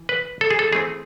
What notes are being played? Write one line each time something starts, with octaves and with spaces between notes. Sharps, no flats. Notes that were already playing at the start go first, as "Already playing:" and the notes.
Already playing: E3
B4
A4
G#4
A4
E3 A3 C4 G#4